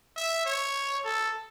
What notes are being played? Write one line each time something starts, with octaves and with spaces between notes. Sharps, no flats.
E5
C#5
A4